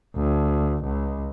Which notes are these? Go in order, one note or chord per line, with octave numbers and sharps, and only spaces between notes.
D2
C#2